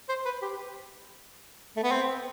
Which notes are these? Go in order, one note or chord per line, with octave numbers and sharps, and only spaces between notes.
C5
B4
G4
A3
B3
C4